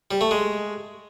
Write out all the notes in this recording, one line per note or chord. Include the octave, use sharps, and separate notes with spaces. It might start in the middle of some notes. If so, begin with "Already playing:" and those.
G3
A3
G#3